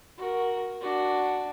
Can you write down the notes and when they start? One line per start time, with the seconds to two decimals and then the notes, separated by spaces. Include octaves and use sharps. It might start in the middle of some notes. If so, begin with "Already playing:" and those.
0.17 F#4 A#4
0.80 D4 F#4